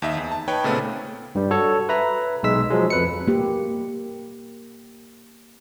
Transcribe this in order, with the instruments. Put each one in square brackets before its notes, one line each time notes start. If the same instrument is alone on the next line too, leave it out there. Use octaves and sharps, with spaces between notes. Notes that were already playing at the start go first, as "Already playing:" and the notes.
[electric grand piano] D#2 D#4 E5
E2
A5
D#4 B4 C#5 G5
A#2 C#3 A3 B3 C4
[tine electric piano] G2 G3
F#4 A4 C#5
B4 E5 A#5
B1 G#3 E6 B6
F3 F#3 G#3
F2 B4 C#7
[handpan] A#3 G4